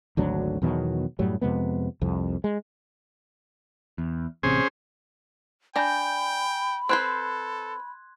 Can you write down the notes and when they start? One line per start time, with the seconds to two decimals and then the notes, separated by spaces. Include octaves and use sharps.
0.17 G#1 D2 F#3 D4
0.62 E2 B2 D#3 F#3
1.19 F#2 A2 F#3 G3
1.41 F2 C3 G#3 B3
2.01 C2 F2
2.44 G#3
3.98 E2
4.43 A1 C3 C#4 G#4 C5
5.76 D4 G5 G#5 A#5 B5 G6
6.89 C4 A4 B4 C5 C6 F#6 G#6